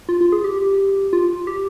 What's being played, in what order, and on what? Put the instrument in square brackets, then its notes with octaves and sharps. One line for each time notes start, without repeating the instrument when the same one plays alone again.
[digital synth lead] F4
F4
G#4
G4
F4
G4